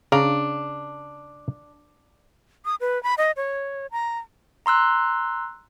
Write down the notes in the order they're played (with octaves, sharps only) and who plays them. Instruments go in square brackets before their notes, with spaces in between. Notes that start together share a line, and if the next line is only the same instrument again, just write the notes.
[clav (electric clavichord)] C#3 F5 A#5 [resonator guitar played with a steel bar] D4
[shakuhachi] D#6
B4
B5
D#5
C#5
A#5
[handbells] A#5 C6 E6 F#6